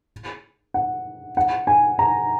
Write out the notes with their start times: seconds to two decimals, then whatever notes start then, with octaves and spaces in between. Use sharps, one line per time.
0.74 F#5
1.37 F#5
1.67 G#5
1.99 A#5